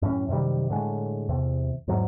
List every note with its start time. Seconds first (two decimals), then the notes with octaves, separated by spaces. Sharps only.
0.02 F#2 A2 E3 C#4
0.29 F#2 C3 D#3 G3
0.70 A2 D3 G#3
1.29 E2 C3
1.88 E2 G#2 F#3